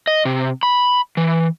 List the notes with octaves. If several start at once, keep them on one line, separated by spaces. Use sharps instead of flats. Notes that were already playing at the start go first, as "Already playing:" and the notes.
D#5
C3
B5
E3